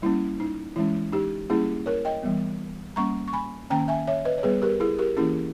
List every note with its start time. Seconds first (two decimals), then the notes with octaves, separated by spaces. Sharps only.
0.02 G3 A#3 C#4 E4
0.40 D#4
0.76 E3 G#3 C#4 E4
1.12 D#4 G4
1.50 G3 A#3 C#4 E4 G#4
1.86 A#4 C#5
2.05 D#5 G5
2.23 E3 G3 B3
2.96 G3 A#3 C#4 A#5 C#6
3.28 C#6
3.33 G#5 B5
3.70 D#3 A#3 C#4 G5 A#5
3.88 E5 G#5
4.07 C#5 E5
4.25 B4 D#5
4.38 C#5
4.43 G3 B3 G#4 B4
4.62 G4 A#4
4.80 E4 G#4
4.99 G4 A#4
5.17 E3 A#3 C#4 E4 G#4